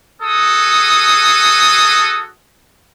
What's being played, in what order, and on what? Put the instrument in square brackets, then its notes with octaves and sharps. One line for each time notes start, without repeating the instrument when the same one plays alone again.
[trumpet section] F#4 G#4 A4 D#6